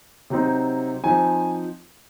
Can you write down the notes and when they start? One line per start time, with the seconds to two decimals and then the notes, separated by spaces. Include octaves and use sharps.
0.30 C3 F#3 C4 D#4
1.04 F3 C4 D#4 G#5